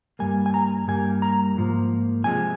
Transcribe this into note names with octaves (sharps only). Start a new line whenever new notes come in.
G2 G3 A#3 G#5
G#5
A#5
G2 G3 A#3 G#5
A#5
G#2 F3 A#3
C3 F3 G#3 G#5